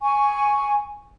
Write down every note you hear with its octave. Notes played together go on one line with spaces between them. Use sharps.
G#5 C#6